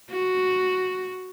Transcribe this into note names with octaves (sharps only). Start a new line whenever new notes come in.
F#4